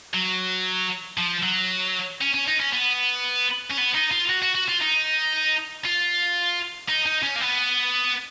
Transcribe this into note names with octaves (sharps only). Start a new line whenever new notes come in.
F#3
F3
F#3
C#4
C#4
D#4
C#4
B3
C#4
B3
D#4
F4
F#4
F#4
F#4
F4
D#4
F4
D#4
D#4
C#4
A#3
B3